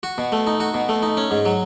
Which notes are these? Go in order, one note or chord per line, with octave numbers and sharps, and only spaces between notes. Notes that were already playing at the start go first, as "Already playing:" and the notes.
F#4
B2
A3
D#4
F#4
B2
A3
D#4
C#4
G#2
F#3